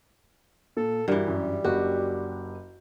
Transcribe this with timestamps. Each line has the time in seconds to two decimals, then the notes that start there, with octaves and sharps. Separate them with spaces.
0.77 A#2 A4
1.08 G2 E3 G3 F#4 A#4
1.28 F#2
1.64 F#1 F#4 G4 F#5